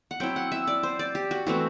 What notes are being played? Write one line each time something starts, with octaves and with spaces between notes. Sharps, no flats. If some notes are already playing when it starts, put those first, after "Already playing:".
F#5
F#3 C4 E4 G5
F#5
E5
D5
C5
D5
G4
F#4
E3 A3 C4 F#4